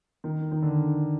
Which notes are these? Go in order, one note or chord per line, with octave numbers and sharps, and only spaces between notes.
D#3
D#3
D3